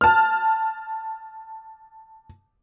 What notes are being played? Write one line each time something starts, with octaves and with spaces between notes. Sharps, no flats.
A5 F6